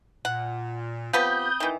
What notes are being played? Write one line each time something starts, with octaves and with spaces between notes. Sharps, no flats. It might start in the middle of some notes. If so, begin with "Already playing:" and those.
A#2 F#5
F3 B3 C4 G4 B5 D#6 G6
D#3 E3